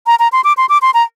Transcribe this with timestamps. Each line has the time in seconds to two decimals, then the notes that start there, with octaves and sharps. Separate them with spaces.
0.07 A#5
0.19 A#5
0.32 C6
0.44 D6
0.57 C6
0.69 D6
0.82 C6
0.94 A#5